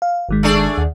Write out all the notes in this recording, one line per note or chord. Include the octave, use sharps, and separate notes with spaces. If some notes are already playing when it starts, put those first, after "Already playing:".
F5
G1 D#3 G#3
A3 D4 G#4
D#2